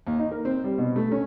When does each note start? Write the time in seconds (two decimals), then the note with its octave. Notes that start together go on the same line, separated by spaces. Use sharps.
0.07 D#2
0.19 D#4
0.31 A#4
0.45 C4
0.64 G3
0.78 B2
0.96 A3
1.11 C#4